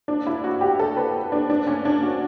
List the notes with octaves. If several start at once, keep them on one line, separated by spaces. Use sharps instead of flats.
D4
E4
F#4
G4
A4
B4
D4
D4
C#4
D4
F#4